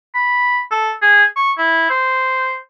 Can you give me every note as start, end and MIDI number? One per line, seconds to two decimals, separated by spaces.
0.15 0.59 83
0.71 0.92 69
1.02 1.24 68
1.36 1.52 85
1.58 1.88 64
1.90 2.57 72